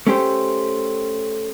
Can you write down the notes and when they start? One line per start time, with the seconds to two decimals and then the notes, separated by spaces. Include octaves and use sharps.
0.07 A3 C#4 G4 C5